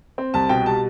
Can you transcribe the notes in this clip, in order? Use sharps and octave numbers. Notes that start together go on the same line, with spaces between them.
C4
C2 A5
B2 G5
G3 A5